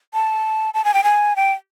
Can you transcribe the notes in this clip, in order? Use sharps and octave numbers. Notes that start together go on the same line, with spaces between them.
A5
A5
G#5
G5
G#5
G5